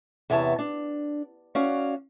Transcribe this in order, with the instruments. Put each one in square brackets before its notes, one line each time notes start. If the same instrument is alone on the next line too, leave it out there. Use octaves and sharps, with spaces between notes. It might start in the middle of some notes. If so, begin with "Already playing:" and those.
[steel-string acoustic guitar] E2 C3 B3 C#5 A5
D4
C#4 F#4 D5 F5